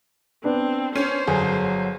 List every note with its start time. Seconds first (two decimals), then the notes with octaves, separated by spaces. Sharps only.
0.44 B3 C4 D4
0.95 C#4 C5
1.27 G1 F#3 G#4